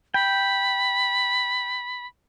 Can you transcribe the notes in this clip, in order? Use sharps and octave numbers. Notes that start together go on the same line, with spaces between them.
G5 B5